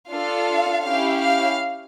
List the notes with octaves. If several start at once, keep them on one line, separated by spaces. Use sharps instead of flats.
D4 F4 A4 F5
C#4 E4 G4 F5
F5